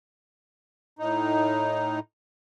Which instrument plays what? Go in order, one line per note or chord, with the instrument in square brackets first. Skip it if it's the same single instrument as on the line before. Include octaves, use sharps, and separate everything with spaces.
[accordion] A2 D#4